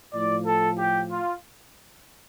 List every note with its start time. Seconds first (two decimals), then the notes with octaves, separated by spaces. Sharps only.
0.14 A2 F3 D5
0.46 A4
0.79 G4
1.11 F4